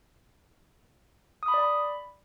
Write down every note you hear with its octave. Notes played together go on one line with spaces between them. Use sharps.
D#6
B5
D5
B5